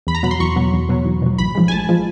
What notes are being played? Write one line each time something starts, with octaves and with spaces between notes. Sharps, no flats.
E2 B5
A#5
B2 F#3 B5
C6
E2 C#6
B2 F#3
E2
B2 F#3
E2
B2 F#3
A1 B5
G#2 F3 G#3
G#5
A1 A5
F3 G#3